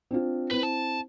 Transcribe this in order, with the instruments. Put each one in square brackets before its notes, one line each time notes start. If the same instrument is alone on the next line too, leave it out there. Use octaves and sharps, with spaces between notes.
[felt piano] C4 D4 F4
[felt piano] C4 E4 [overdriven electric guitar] B4
[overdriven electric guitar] A5